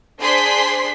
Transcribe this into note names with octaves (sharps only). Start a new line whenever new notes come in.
D4 G#4 C5 C6 B6